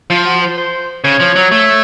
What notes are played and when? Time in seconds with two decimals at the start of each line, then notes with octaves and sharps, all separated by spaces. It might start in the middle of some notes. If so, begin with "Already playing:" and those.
0.10 F3 F4
0.26 F#4
0.42 C5
0.57 C5
1.04 C#3 C#5
1.20 F3
1.36 F#3
1.52 A3